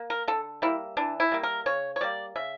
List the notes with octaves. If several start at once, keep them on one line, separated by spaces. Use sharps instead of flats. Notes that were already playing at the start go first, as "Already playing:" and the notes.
Already playing: A#3
A#4
D3 A4
G3 A#3 E4
E3 D4
E4
G3 A#3
A#4
C#3 C#5
C#5
G3 A#3 D5
C#3 E5